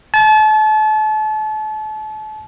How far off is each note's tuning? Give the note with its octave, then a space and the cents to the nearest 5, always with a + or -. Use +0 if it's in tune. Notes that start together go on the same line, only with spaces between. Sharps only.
A5 -35